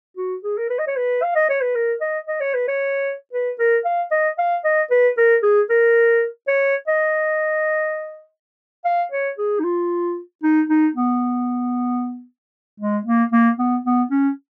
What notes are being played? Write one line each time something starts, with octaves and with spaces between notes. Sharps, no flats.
F#4
G#4
A#4
B4
D#5
C#5
B4
F5
D#5
C#5
B4
A#4
D#5
D#5
C#5
B4
C#5
B4
A#4
F5
D#5
F5
D#5
B4
A#4
G#4
A#4
C#5
D#5
F5
C#5
G#4
D#4
F4
D#4
D#4
B3
G#3
A#3
A#3
B3
B3
C#4